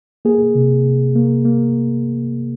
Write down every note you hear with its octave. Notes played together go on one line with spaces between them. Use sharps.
A#3 G#4
C3
C3
A#3
A#3